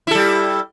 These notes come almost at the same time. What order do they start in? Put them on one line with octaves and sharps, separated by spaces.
E4 A4 G3